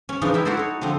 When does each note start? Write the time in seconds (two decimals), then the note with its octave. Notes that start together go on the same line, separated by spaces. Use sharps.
0.09 C#4
0.21 C#3 E3 F3 D4 D#4
0.34 E4 A#4 E5 G5
0.45 E4 F#4 A4 A#4 C5 D5
0.57 D#4 C#5
0.81 D3 F3 C4